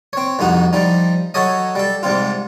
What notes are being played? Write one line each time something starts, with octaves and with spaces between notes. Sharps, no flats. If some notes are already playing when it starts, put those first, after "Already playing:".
C4 C#5
C2 F2 D#4 F#4
F3 G3 D#4
F#3 A4 C#5 D#5
G3 A4
G#2 C3 G3 F4